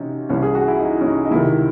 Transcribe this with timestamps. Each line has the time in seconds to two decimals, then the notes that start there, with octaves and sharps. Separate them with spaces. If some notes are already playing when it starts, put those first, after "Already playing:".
Already playing: C3 E3 C#4 D#4 F#4
0.29 C2 C3 E3 C#4
0.43 G#4
0.55 F#4
0.68 E4
0.81 D#4
1.01 C#4
1.06 D#4
1.25 D#4
1.31 C#2 C3 D#3 E4